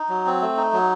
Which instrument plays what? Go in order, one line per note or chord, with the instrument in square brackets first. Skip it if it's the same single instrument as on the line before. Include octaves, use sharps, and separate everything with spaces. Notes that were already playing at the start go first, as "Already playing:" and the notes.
Already playing: [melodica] D#4
F#3
C4
A3
D#4
F#3